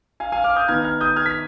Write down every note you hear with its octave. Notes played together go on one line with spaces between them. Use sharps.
F5 G#5
F5 G#5
D6 F6
D#6 G6
D#3 B3 F6 G#6
F6 G#6
D#6 G6
F6 G#6
B6